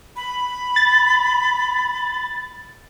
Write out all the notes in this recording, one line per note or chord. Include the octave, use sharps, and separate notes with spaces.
B5
A6